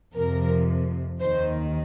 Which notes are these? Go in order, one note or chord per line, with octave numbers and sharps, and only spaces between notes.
F2 C3 F3 A#4
D#2 D#3 C5